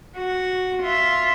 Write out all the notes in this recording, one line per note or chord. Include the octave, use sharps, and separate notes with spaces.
F#4
F4 E5